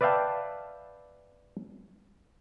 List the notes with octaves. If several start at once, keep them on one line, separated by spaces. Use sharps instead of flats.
B4 D5 E5 F5 G5 A5